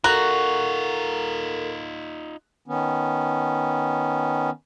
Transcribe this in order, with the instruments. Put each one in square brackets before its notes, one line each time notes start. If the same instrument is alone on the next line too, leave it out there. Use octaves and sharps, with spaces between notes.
[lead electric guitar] D#4 F4 [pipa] F#4 [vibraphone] A4 A#4 [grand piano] A#5 F#6
[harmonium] D#3 B3 C#4